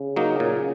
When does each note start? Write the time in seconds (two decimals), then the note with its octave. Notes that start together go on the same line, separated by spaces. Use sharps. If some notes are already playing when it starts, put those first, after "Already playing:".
Already playing: C#3
0.16 F#3 A#3 D#4
0.40 A#2